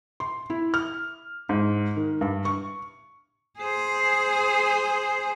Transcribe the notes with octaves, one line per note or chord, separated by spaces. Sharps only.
C6
E4
F6
G#2
D#3
G2
C#6
G#4 C5